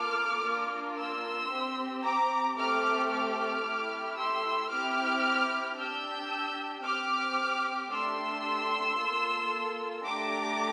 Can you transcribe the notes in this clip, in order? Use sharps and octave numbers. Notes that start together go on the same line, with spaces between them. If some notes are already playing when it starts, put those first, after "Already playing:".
Already playing: A#3 F4 A4 D6 F6
A#3 D4 F4
C6 E6
C4 G4
A#5 D6
A3 C4 G4 D6 F6
D6 F6
A3 E4 G4
C6 E6
C4 E4 G4 D6 F6
D4 G4 E6 G6
C4 G4 D6 F6
A3 D4 G4 C6 E6
A#3 F4 A4
A3 D4 G4 A#5 D6